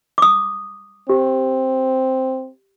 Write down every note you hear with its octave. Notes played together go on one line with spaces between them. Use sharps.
D6 D#6
C4 G4